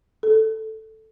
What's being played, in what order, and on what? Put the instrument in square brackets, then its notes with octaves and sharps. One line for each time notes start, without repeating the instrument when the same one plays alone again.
[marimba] A4